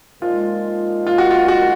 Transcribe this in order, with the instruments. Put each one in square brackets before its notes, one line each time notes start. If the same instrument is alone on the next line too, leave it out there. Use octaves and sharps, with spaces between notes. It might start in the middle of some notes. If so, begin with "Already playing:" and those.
[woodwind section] A#2 F3 G#3 D#4 [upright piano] F4
[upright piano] F4
F#4
F4
F#4